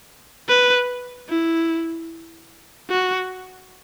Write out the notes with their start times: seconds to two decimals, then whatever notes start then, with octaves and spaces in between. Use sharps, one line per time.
0.49 B4
1.29 E4
2.90 F#4